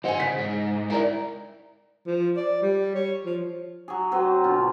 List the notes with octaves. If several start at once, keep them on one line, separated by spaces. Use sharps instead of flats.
D#3 C5 D#5 F#5 G#5
C#3 B6
G#2
E4 A#4 D5 A#5
F3
D5
G3
C#5
F3
F#3 G#4
F#3 C4 C5
B2 D3 F4